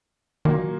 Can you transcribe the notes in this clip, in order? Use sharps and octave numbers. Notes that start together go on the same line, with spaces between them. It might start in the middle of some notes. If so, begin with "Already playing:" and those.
A#2 D#3 F#3 A#3